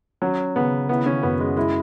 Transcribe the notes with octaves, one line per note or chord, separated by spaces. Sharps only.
F#3 C#4
C#3 B3
B3 E4
C#4
F#2 B3
G#3
G#3 E4